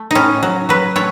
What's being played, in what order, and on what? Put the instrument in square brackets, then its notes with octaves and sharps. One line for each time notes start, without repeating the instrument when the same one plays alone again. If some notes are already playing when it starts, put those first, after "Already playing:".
Already playing: [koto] A3
A2 C#4 D#4
F#3
F#3 B4
A3 C#5